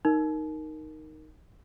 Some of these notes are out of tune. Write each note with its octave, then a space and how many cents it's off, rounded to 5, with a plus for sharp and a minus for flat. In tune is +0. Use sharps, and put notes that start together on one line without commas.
D#4 +0 A#4 +0